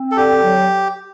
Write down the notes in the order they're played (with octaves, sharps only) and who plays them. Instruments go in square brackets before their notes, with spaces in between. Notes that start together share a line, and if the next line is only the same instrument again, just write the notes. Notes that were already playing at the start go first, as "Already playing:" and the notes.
Already playing: [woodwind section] C4
[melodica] A4
[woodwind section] D3 [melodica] G4
[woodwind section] F#3